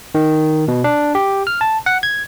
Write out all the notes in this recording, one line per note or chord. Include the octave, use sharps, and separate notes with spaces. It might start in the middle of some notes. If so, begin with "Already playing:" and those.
D#3
B2
D4
G4
F6
A5
F#5
G#6